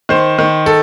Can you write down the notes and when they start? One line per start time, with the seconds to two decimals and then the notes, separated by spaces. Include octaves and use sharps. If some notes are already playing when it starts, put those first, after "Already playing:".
0.09 D#3 C5
0.39 D#3
0.66 A4